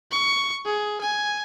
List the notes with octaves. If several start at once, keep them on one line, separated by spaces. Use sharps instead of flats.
C#6
G#4
G#5